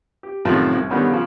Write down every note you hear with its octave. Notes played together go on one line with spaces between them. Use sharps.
G4
F#2 A2 C3 D#3 F3
C2
D3 D#3 G3 B3 C#4
C#3 F3